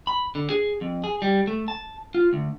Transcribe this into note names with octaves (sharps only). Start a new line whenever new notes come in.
B5
D3
G#4
F2
G#4
G3
A3
A5
F4
D2